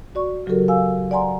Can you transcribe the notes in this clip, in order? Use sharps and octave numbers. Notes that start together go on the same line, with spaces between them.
F#4 D5 C#6
C#3 F#3 F#4 G4 A4 A#4
F5 G#5 E6
D5 F#5 G#5 A#5 C6